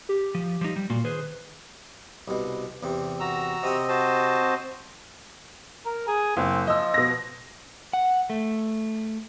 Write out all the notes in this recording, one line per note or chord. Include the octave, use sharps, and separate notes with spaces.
G4
F3
F3 G3 D#4
G3
A#2 A#3 F4 F#4
D#3 G#4 B4 C5
C2 B2
E2 C3
F#4 A#5 E6
C3 C4 D#5 F#5
F#4 C5 A5
A#4
G#4
F#1 C4
F3 D#5 E6
B2 A#6
F#5
A3